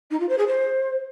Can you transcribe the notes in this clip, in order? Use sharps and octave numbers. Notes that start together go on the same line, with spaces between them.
D#4
F4
C5
G#4
C5